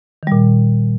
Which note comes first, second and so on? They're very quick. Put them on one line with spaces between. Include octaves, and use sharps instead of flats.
D#3 G3 A#2